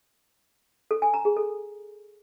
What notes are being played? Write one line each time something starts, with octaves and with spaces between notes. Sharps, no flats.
A4
G#5
A#5
G#4
A4